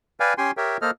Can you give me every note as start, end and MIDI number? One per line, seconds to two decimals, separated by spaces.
0.20 0.34 71
0.20 0.34 74
0.20 0.34 77
0.20 0.34 79
0.20 0.34 80
0.38 0.51 61
0.38 0.51 67
0.38 0.51 79
0.38 0.51 80
0.38 0.51 84
0.57 0.77 67
0.57 0.77 70
0.57 0.77 73
0.57 0.77 76
0.57 0.77 79
0.82 0.91 58
0.82 0.91 69
0.82 0.91 72
0.82 0.91 75
0.82 0.91 89